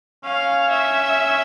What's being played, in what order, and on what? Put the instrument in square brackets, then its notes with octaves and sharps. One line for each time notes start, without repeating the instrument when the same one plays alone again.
[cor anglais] C#4 [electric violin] F5
[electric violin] E5